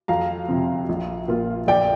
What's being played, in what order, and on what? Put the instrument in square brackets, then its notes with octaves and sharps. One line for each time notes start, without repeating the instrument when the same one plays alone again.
[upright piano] F2 F5 A#5
C3 F3 C4
A#1
A#2 A#3 F4
A#1 D5 G5